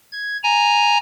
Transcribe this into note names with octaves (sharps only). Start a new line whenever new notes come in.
G#6
G#5 A#5